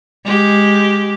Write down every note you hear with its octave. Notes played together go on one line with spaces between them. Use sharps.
G#3 G4